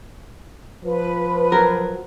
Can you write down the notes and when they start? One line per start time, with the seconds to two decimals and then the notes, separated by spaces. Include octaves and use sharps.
0.84 F3 B4
1.52 F#3 A#4